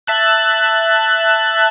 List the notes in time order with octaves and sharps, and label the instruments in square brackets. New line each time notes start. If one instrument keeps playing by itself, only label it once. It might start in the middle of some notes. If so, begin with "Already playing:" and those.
[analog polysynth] E5 A5 F#6